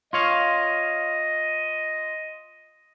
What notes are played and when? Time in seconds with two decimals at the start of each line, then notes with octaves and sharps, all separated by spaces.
0.13 F4 C#5 D#5 F5